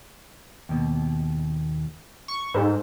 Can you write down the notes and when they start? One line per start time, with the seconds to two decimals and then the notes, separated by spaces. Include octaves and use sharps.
0.69 D#2 B2
2.28 C#6
2.54 G#2 A4 C5